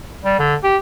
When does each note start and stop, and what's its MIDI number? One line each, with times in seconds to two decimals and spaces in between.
0.24 0.36 55
0.39 0.55 50
0.63 0.77 67